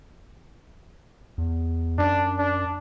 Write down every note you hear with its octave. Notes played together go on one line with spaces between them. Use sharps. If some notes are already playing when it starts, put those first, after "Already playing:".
E2
F#2 D4
D4